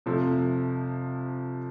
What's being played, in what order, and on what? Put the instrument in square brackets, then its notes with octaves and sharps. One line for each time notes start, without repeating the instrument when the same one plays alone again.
[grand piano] F2 C3 F3 A3